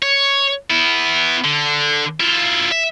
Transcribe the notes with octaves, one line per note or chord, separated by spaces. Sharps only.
C#5
B3 E4
D3
E4 F4
E5